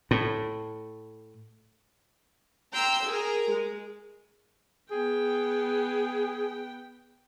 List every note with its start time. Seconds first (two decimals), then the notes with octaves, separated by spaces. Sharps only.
0.11 A2
2.73 G5 A#5 C6 E6 G6
3.06 G#4 A#4
3.51 G#3
4.91 B3 G#4 G5